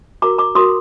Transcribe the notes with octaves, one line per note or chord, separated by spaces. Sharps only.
F#4 A#4 A#5 D6
A#5 D6
F#4 A#4 C6 D#6